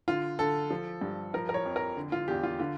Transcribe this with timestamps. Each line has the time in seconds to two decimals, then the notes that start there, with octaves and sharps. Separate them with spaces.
0.08 D3 F4
0.39 D3 A4
0.70 F3
1.01 G2
1.34 F3 A#4
1.49 A#4
1.54 C#5
1.66 F2
1.76 A#4
1.96 D3
2.12 F4
2.28 E2 G4
2.43 F4
2.59 D3 F4